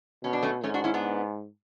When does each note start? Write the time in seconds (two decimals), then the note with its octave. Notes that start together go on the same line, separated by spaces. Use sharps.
0.24 B2 C#4
0.33 D4
0.43 A3 C#4
0.63 G#2 A3 C#4
0.74 D4 F#4
0.84 C#4 E4
0.94 B3 D4